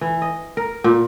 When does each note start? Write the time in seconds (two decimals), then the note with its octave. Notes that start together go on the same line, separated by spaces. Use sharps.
0.01 E3
0.22 D#5
0.57 A#4
0.84 A#2